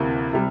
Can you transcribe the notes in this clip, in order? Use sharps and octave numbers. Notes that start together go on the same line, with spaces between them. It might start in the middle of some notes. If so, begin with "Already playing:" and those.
Already playing: D2 C3 E3 A#3
C3 G3